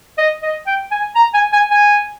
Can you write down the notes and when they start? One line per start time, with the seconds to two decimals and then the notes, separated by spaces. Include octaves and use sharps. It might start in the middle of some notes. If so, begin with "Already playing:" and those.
0.18 D#5
0.43 D#5
0.67 G5
0.91 G#5
1.16 A#5
1.34 G#5
1.53 G#5
1.71 G#5